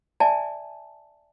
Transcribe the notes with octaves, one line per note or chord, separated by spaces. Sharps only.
D5 E5 G#5 A5